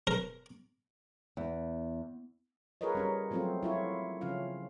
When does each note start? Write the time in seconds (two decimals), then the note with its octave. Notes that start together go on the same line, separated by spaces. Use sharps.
0.07 A#4
1.37 E2
2.81 F4 G#4 A#4 B4 C#5 D#5
2.95 G3 C#4 A#4
3.31 F3 F#3 A3 C4 C#4 F4
3.63 E4 F4 C#5
4.21 C#3 F3 C#4 F4 F5